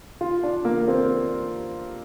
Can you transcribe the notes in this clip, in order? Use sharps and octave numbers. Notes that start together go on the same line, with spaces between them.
F4
D4
A#3
C4